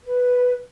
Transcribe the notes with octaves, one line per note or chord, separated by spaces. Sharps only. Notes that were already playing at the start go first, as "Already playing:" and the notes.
B4